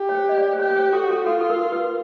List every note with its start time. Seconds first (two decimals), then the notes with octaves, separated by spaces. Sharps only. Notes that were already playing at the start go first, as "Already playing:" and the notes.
Already playing: G4
0.09 C#5
0.15 C5
0.29 D#5
0.38 D5
0.53 C5
0.59 G4 C#5
0.70 C#5
0.76 C5
0.93 F#4 A4
1.10 A4
1.26 F4 A4
1.41 A4
1.50 A#4
1.72 B4